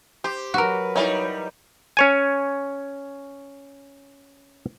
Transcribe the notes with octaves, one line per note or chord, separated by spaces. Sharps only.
G4 C5
F#3 F#4 A#4 B4
E3 G3 D#4 C#5
C#4 C#5 G#5